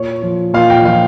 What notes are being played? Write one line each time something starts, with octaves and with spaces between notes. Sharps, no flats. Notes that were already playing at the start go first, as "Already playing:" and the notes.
Already playing: A#2 C#5
F3
A#2 F5
G5
F3 F5